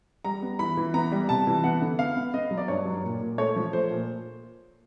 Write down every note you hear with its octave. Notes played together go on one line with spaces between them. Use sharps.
G3 A#5
B3
E3 B5
E3
B3 A#5
G3
C3 A5
E3
B3 F#5
D3
B3 F5
B3
B3 D#5
F#3
D5
G2 C#5
F#3
A#2
A#2
A3 C#5
F3
A3 C5
A#2